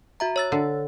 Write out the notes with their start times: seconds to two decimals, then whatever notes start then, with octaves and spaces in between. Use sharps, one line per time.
0.20 F#4 E5 A#5
0.36 C#5 E6 A6
0.52 D3